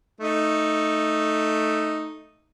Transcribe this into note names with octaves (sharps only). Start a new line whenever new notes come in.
A3 D#4